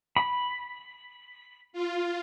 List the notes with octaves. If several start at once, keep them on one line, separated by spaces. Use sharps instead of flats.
B5
F4